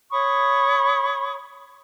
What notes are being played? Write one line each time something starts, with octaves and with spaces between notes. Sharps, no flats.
C#5 B5 C#6 D#6